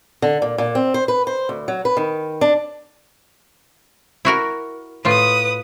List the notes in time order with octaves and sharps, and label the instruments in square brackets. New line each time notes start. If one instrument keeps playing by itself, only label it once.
[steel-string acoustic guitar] D3
A#2
A#2
C4
C5
B4
C5
D2
F#3
B4
D#3
D4
[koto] E4 F#4 A#4
[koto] A2 F4 [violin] B4 D#6